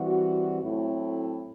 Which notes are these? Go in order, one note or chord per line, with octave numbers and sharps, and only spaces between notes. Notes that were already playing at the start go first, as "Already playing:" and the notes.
Already playing: E3 G3 C4 F#4
A2 F#3 A3 C4 E4